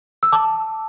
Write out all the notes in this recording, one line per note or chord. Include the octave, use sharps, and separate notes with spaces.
E6
A5 D6